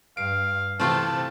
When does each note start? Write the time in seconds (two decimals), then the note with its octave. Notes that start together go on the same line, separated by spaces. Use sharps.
0.17 G2 F5 D7
0.80 C3 E3 A3 C4 F4 G5 A5